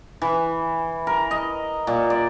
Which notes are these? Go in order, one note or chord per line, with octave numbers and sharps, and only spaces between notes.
E3
A#4
D#5
A#2
D5